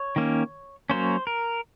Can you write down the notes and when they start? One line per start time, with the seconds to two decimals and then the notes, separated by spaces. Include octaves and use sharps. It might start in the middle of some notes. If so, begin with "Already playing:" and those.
Already playing: C#5
0.16 D#3 A#3 C#4
0.90 F#3 A#3 C#4 C5
1.27 A#4